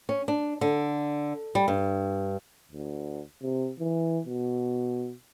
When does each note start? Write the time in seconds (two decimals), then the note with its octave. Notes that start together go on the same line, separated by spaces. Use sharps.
0.09 C#4
0.28 D4
0.61 D3
1.55 G3
1.68 G2
2.72 D2
3.42 C3
3.80 E3
4.26 B2